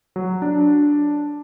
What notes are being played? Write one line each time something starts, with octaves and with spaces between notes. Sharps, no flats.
F#3
D4